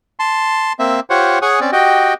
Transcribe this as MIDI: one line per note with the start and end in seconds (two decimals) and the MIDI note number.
0.20 0.73 81
0.20 0.73 84
0.79 1.00 58
0.79 1.00 60
0.79 1.00 76
1.10 1.39 65
1.10 1.39 67
1.10 1.39 72
1.10 1.39 73
1.10 1.39 78
1.42 1.60 68
1.42 1.60 73
1.42 1.60 78
1.42 1.60 80
1.42 1.60 87
1.61 1.71 60
1.61 1.71 61
1.61 1.71 74
1.72 2.14 66
1.72 2.14 67
1.72 2.14 75
1.72 2.14 79